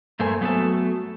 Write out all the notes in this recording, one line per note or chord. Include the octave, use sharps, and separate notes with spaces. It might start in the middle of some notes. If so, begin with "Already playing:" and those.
G2 A3 A#3 C5 G#5
F#3 A3 B3 D#4 F#4 A4